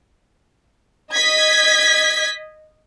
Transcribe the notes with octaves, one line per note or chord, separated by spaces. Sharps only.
D#5 G#6 B6